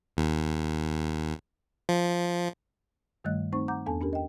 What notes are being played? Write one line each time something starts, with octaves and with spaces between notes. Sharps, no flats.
D#2
F3
G2 D#3 G3 A3 D#5 F#6
A3 C4 D#4 C5 C#6
F#5 A#5 D6 G6
E2 B3 D4 A4 G#5 A5
C#4 D4 G4 A#4
D#5 G5